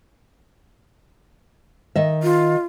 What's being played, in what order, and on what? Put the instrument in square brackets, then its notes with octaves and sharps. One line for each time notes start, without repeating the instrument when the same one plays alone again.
[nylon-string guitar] D#3 D#5 E5
[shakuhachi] F4